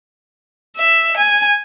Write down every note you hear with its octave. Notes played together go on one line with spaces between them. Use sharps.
E5
G#5